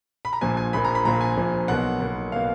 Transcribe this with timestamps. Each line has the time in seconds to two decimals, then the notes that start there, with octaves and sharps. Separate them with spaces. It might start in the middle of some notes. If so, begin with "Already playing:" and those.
0.25 B5
0.33 A#5
0.41 A#1 A#2 F3 A#3 G#5
0.57 G#5
0.73 A#1 A#2 F3 A#3 B5
0.85 A#5
0.95 B5
1.05 A#1 A#2 F3 A#3 A#5
1.21 G#5
1.37 A#1 A#2 F3 A#3
1.68 B1 B2 A#3 F#5
2.00 B1 B2 A#3
2.32 B2 A#3 F5